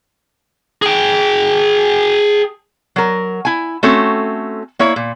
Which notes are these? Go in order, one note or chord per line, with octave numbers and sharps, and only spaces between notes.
G#4 G5
F#3 A#4
E4 G#5
A3 C4 C#4 F#4 A4
A#3 E4 C#5
A#2